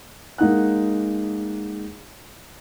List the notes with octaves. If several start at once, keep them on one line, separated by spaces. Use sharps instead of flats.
G#3 A#3 D#4 F#5 F#6